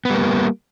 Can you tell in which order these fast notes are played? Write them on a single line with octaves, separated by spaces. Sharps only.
B3 G3 A#3